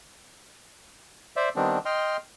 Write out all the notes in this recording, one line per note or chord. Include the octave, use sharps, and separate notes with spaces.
C5 D5 E5
D#3 G3 B3 C4 D4
D#5 G5 C6 F6